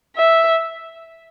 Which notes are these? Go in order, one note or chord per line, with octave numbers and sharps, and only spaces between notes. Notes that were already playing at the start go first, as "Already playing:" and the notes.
E5